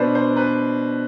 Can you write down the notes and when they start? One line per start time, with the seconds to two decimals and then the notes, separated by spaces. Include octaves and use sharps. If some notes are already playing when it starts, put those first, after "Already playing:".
Already playing: B2 B3 D4 B4 C5 D5
0.15 C5
0.36 B4